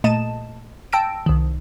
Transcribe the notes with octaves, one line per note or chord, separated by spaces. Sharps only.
A#2 A3 D#5 A5 D#7 E7
G5 A5 E6 A#6 D7
C2 D#3